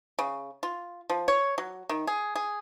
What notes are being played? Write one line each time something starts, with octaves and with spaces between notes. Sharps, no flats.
C#3
F4
F3
C#5
F#3
D#3
G#4
G#4